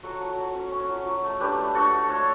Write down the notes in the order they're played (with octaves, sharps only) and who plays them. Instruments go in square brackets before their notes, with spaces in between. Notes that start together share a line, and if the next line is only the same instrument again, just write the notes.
[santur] F#3 F#4 A4
F#3
F#3
C#4
C#4
F#3
F#3
A3
D4 G4 B4
A3
D4 F#4 A4
A3
A3 A4 C#5